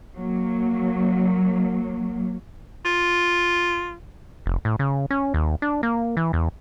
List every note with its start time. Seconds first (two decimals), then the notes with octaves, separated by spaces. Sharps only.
0.17 F#3 A#3
2.85 F4
4.46 F1
4.65 A2
4.79 C#3
5.10 C#4
5.34 D#2
5.62 D4
5.83 A#3
6.17 E3
6.33 E2